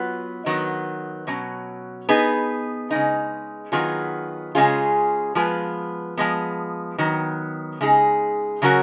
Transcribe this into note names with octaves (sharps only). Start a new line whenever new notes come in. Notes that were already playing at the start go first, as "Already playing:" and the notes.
Already playing: F#3 B3 F4 B4
D#3 F#3 B3
B2 F#3 C#4
B3 D#4 G#4 B4
C#3 G#3 D#4
D#3 F#3 B3 F4 G#4
C#3 G#3 C#4 F4 G#4
F3 G#3 B3 F4 B4
F3 G#3 B3
D#3 F#3 B3
C#3 G#3 D#4 G#4
C#3 F#3 C#4 F#4 A#4